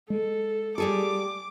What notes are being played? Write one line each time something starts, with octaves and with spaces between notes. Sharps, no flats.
G#3 A4
G3 G#4 A4 D6